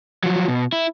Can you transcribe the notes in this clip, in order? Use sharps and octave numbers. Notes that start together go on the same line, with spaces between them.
F3 F#3
B2
E4